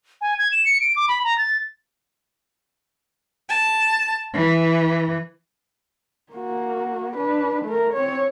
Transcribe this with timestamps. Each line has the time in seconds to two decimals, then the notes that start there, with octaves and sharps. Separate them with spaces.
0.21 G#5
0.39 G#6
0.52 E7
0.65 C#7
0.81 D7
0.96 D6
1.08 B5
1.24 A#5
1.38 A6
3.49 A5
4.36 E3
6.32 A#3 F#4
7.17 D4 B4
7.65 A3 A#4
7.94 C4 C#5